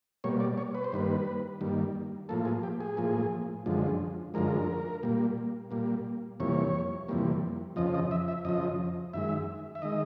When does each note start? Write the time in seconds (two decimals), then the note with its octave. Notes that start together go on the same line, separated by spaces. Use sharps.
0.24 B2 G3 A#3 C#5
0.40 D5
0.58 C#5
0.75 B4
0.84 C5
0.92 G2 D#3 G3 A#3 B4
1.61 G2 D#3 G3 A#3
2.29 A2 F3 A#3 A4
2.45 G#4
2.63 G4
2.81 G#4
2.97 A2 F3 A#3
3.66 F#2 D3 F3 G#3
4.34 F#2 D3 F3 G#3 A#4
5.03 A#2 G3 A#3
5.71 A#2 G3 A#3
6.40 F2 C3 E3 G3 A#3 C#5
7.08 F2 C3 E3 G3 A#3
7.76 F2 C#3 F3 D#5
7.94 D#5
8.11 E5
8.28 E5
8.45 F2 C#3 F3 D#5
9.14 F#2 D#3 G#3 E5
9.75 E5
9.82 D#3 G#3 D#5